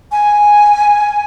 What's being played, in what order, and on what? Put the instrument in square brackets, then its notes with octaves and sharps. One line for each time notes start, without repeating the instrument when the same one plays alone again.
[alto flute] G#5